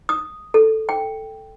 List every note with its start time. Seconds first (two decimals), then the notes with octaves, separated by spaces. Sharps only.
0.09 D#6
0.54 A4
0.89 G5